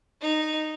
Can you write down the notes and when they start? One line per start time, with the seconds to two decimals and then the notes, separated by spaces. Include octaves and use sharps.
0.21 D#4